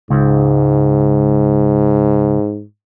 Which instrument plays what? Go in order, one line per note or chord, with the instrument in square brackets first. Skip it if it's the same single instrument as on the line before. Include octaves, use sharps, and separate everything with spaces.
[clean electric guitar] C#2 [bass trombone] G#2